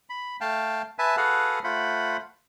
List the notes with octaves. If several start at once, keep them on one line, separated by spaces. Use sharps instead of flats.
B5
A3 F5 G5 A5
B4 E5 G#5 A5
F#4 G#4 A4 B4 F5 F#5
A3 F4 C5 F#5 B5